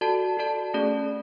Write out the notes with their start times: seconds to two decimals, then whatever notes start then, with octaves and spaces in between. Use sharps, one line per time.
0.01 F#4 A4 D5 A5
0.37 F#4 A4 D5 A5
0.74 A3 C#4 G#4 D5